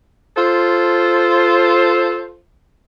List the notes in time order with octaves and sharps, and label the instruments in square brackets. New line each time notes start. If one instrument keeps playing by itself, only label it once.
[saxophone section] F4 A4 C5